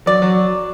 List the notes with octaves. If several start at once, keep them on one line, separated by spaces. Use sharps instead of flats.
F#3 D5
F#3